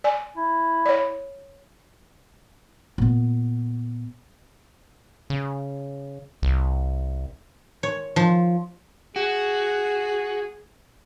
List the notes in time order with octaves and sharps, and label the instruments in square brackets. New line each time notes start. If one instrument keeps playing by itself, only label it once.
[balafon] D5 G#5
[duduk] E4
[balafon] C#5 D5
[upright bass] A#2 B3
[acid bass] C#3
C2
[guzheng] C#5
F3
[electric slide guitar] F#4 [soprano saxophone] G#4